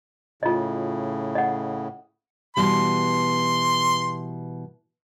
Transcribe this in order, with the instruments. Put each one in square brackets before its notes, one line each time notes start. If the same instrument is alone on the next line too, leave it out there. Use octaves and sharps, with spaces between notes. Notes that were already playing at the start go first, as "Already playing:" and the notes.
[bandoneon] A2 C#3 [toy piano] F4 D#5
[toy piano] D#5 F#5
[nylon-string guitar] B2 E3 G3 [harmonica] C6